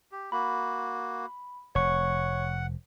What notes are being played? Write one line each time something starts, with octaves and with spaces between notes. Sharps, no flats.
G4
A#3 F#4 B5
F1 C#5 F#5 C#6